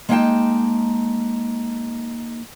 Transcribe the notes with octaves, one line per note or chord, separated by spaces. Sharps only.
G#3 A#3 D#4 F5 G5 A5